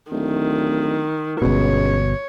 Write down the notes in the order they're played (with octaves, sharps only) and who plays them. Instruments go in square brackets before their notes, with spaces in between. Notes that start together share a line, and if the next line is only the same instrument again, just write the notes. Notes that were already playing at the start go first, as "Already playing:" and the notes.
[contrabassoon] D1 [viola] D#3
[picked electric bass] G1 B2 [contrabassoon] C#2 [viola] C#5